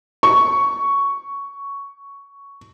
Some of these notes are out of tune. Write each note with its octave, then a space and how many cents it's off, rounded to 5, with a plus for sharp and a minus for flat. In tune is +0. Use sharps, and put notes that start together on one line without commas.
C#6 +5